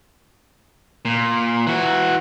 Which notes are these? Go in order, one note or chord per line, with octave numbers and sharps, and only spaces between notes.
A#2
E3 F#4